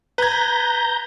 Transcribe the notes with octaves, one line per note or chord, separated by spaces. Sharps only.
B4 A#5 G6 G#6